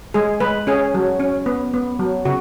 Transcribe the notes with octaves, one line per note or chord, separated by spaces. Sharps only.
G#3 G#4
G#3 B4
C#4 G#4
F#3
C#4
B3
B3
F#3
C#3 F#4